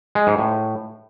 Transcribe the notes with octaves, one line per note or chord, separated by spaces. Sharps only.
G#3
G#2
A2